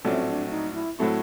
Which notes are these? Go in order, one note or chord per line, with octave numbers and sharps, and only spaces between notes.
A#1 A2 F#3 A3 C4 C#4
D4
D#4
E4
A2 F#3 A3 C4 E4